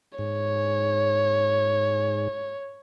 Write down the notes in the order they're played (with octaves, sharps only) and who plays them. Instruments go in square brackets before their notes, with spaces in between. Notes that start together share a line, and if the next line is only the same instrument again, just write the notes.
[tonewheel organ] G#2 [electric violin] C#5